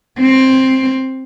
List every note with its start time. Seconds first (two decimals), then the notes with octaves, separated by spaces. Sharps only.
0.20 C4